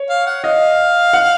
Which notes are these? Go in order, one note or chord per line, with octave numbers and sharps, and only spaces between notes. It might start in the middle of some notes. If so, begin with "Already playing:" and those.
Already playing: C#5
F5
F#5
D#5 F5
F#5